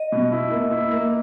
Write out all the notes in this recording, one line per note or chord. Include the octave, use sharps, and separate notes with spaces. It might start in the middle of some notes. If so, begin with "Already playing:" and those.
Already playing: D#5
B2
E4
A#3
E4
A#3